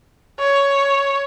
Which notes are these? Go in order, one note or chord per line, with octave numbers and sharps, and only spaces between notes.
C#5